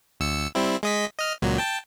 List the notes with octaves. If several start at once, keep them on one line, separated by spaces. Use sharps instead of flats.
D2 E6 C#7
G3 C4 E4
G#3 D#5 B6
D#5 F6
C#2 A#2 F#3
G5 A5